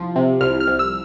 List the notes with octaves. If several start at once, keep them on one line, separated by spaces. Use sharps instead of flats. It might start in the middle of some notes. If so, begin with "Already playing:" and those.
Already playing: C2 F3
C3
C2 F6
F6
C2
E6